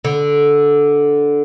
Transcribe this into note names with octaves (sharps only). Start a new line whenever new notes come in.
D3